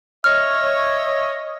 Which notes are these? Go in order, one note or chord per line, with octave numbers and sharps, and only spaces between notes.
C#5 D#5 E5 F6